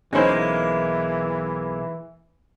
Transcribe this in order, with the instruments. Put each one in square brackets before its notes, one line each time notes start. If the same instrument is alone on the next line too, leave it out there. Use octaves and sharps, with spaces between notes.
[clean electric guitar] B1 E4 [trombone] E3 [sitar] G#3 A#3 [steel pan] C#4 D#4 C5